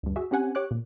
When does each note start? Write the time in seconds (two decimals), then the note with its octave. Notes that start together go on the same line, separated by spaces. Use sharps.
0.03 D2 G2
0.16 F#4 G#4 E5
0.31 C4 C#4 G4 F#5 G#5
0.55 G4 C#5 D6 F#6
0.71 A#2